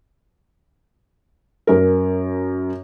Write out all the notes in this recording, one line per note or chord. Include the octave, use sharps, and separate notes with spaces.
F#2 A#4